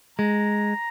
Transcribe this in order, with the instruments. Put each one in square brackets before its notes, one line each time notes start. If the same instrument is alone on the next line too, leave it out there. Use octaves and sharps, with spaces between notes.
[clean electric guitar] G#3 [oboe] A#5